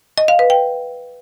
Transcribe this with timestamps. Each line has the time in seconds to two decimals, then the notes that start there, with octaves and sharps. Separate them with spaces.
0.18 D#5
0.28 F5
0.39 B4
0.50 G5